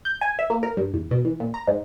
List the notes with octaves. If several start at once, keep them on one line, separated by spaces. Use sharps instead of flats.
G6
G#5
E5
A#3
A#4
G2
E2
B2
E3
A#2
A#5
G#2